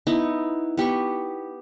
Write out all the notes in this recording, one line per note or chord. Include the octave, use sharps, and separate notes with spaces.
B3 D#4 E4
B3 G4 B5 C#6